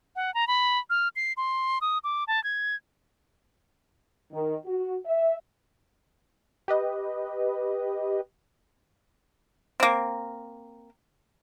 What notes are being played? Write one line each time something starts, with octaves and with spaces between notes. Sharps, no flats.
F#5
A#5
B5
F6
C7
C6
D#6
D6
A5
G#6
D#3
F#4
E5
G4 B4 D#5
A#3 C4